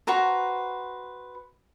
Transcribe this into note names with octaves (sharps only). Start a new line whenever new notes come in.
F#4 B4 C5 A#5